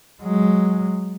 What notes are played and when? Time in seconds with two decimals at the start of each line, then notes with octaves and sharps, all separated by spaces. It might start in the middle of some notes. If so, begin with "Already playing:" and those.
0.22 F#3 G#3